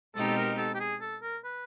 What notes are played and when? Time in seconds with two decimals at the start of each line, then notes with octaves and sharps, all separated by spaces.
0.15 B2 G#3 C4 D#4 G4 A4
0.27 A4
0.37 A#4
0.58 A4
0.75 G4
0.80 G#4
1.01 A4
1.22 A#4
1.44 B4